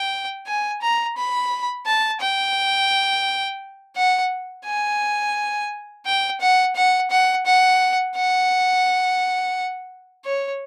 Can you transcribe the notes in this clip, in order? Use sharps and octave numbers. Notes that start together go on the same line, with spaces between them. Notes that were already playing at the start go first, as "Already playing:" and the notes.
Already playing: G5
G#5
A#5
B5
A5
G5
F#5
G#5
G5
F#5
F#5
F#5
F#5
F#5
C#5